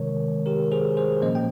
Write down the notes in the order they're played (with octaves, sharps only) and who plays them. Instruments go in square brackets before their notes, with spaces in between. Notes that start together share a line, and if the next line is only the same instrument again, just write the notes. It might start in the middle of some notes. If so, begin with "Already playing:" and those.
Already playing: [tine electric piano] C3 D#3 G#3 A#4 C#5
G4 A#4
G#4 C5
G#4 C5
A#2 F3 A#3 C#4 C5 D#5
G5